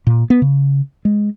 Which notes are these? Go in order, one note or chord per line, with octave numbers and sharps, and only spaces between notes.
A#2
B3
C#3
G#3